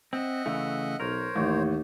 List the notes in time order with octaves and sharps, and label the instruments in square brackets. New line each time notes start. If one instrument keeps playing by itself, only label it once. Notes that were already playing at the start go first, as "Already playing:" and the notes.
[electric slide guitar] C4 [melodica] D#5 E5 F#5
[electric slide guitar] C#3 E3 A3
[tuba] B1 [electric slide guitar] A#4 [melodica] C5 C#5
[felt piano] A1 [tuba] D#2